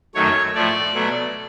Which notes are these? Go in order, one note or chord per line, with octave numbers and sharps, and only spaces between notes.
F#2 D#3 F#3 A3 C#5
A2 F3 A3 D5
B2 F#3 A3